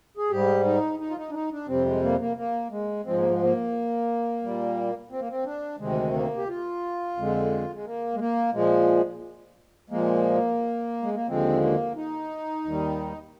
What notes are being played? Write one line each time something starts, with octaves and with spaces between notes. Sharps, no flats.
G#4
G#2 G3 G4
D#4
D#4
F4
D#4
D4
D#4
D4
F2 C3 G3 C4
G#3
A#3
A#3
A#3
G#3
G#2 F3 G#3 C4
A#3
G#3
A#3
A#2 G3
C4
A#3
C4
D4
D2 C3 D#3 G#3
A#3
G4
F4
F2 D3 G#3
G#3
A#3
G#3
A#3
A#2 F3 G#3
A#2 F3 G#3 A#3
G#3
A#3
D#2 D3 F3 G#3 C4
A#3
D#4
D#2 D#3 G3